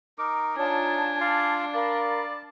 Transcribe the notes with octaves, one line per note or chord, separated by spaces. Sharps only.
D#4 A#4 D6
D4 D#4 F4 C#5 G#5 A5
F4 D5 F5 A5
A#4 D5 F5 A5 B5